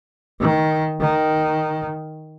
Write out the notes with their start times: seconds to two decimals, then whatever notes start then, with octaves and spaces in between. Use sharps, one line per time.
0.40 D#3
1.00 D#3